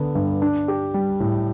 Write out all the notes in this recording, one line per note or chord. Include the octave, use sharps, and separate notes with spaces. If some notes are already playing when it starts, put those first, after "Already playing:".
Already playing: D3 B3
G2
D4
G4
G3
A2